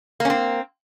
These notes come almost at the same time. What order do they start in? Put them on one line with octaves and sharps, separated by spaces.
A#3 C#4 C4